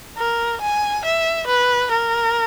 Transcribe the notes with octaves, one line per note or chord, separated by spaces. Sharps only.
A#4
G#5
E5
B4
A#4